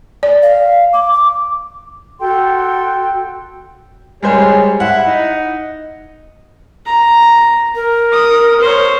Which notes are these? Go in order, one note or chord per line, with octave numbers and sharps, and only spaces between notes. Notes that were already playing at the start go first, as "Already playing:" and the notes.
D5
F5
D6
D6
F#4 A4 G5 C6
G3 G#3 G#4 C5 C#5
E4 F#5
D#4
A#5
A#4
D#6
C5 C#5